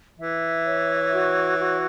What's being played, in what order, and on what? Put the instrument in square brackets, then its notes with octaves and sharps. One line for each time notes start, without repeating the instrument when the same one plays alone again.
[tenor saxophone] E3 [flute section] E5
[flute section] C#5
F#4
F#4